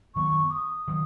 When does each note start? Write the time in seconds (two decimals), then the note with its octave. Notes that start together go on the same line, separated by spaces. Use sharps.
0.15 F#2 D#3 F#3 B3 C#6
0.51 D#6
0.88 D#3 F#3